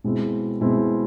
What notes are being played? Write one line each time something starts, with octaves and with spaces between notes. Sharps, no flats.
B2 G#3 C4 E4
B2 G#3 C4 E4